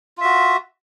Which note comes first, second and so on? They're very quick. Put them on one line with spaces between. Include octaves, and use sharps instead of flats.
F4 E5 F#4